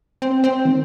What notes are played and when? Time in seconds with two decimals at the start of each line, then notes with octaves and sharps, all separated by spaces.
0.22 C4
0.44 C4
0.65 D#3